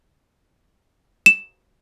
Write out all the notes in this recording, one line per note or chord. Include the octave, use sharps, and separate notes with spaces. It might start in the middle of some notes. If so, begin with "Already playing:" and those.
E7